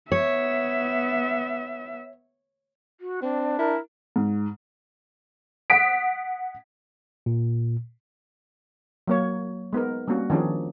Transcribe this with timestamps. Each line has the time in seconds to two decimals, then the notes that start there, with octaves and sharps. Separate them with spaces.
0.12 B3 C#5 E5
3.00 F#4
3.23 C4 D4
3.59 E4 A#4
4.16 G#2
5.70 F#5 D#6 B6 D7
7.26 A#2
9.07 F#3 A#3 C#5
9.73 G#3 B3 D#4 A#4
10.08 G3 A#3 C4 C#4 F#4
10.30 D#3 F3 C#4 D4 G#4